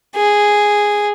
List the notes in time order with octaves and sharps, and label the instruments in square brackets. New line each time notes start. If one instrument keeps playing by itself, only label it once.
[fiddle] G#4